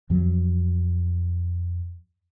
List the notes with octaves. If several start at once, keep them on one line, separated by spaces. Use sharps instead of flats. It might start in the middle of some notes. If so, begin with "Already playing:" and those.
F2 F3 F#3